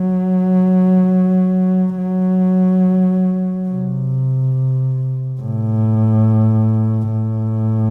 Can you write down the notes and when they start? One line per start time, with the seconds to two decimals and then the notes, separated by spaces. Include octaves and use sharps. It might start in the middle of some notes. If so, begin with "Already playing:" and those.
Already playing: F#3
1.98 F#3
3.69 C3
5.41 A2
7.11 A2